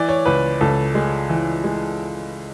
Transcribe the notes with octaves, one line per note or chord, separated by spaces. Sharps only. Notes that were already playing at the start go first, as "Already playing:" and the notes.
Already playing: E3 D5
C#5
C#2 B4
C#2 A4
G#3
E3
G#3